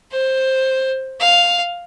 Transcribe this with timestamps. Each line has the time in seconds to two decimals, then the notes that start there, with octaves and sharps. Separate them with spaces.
0.12 C5
1.20 F5